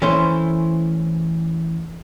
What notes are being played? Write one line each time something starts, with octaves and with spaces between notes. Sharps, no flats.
E3 A3 C#4 E4 C5